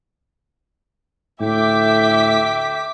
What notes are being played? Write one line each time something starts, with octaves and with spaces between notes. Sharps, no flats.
D2 A2 A3 E5 G5 D6 B6